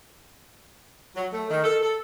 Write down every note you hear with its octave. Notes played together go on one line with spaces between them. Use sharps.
F#3
A3
D#3
A4
A4